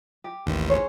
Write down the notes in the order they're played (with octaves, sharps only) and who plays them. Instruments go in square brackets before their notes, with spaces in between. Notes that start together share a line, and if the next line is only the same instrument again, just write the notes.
[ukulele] G4
[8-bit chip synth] A1 D#2
[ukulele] G#4 C5 C#5